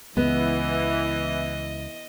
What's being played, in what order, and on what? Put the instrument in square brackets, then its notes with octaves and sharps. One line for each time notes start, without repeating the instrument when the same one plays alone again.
[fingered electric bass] C#2 [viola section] E3 [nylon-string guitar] B3 [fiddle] D#5